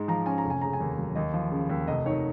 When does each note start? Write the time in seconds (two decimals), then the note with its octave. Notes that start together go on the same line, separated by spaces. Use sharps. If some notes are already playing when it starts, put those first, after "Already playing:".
Already playing: G#2 G#3
0.08 F3 A#5
0.26 C#4 G#5
0.38 A#5
0.44 F1
0.50 G#5
0.61 C#3 A#5
0.73 G#5
0.81 D#2
0.98 F#3
1.15 D#2 D#5
1.34 F3
1.51 C#3
1.70 D#2
1.88 F1 D#5
2.06 D#3 C#5